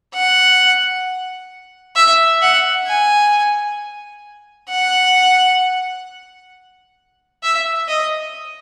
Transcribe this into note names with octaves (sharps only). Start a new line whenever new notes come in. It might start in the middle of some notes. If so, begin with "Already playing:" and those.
F#5
E5
F#5
G#5
F#5
E5
D#5